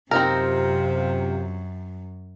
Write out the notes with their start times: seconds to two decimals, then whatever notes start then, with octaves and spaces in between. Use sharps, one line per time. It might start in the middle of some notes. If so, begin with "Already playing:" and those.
0.11 F#2 C3 C4 D#4 F4 A#4